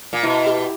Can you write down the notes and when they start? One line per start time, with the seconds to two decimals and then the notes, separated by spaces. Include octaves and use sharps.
0.13 A#2
0.23 B2 E4
0.47 G4